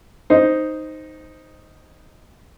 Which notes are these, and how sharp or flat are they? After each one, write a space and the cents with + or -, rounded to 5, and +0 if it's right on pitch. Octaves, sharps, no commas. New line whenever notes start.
D#4 +0 C5 -5